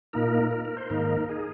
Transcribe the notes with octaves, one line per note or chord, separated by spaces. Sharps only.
A#2 A#3 D#4 A#4
A#4
A#4
C5
G#2 D#3 A#3 D#4 A#4
G#4